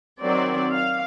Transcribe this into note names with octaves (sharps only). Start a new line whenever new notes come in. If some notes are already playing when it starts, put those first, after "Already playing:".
D#3 F#3 C4 D5
F5